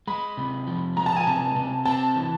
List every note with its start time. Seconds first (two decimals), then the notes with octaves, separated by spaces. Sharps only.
0.07 G#3 B5
0.37 C3
0.67 F3
0.97 G#3 A#5
1.06 A5
1.16 G#5
1.26 C3 A5
1.56 C3
1.86 C4 A5
2.15 E3